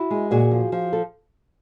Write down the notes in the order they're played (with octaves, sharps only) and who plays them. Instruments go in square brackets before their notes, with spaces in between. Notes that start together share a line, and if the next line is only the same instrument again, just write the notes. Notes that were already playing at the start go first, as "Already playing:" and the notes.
Already playing: [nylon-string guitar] E4 F#4
G#3
A#2 F#4 G#4
F3
F3
A4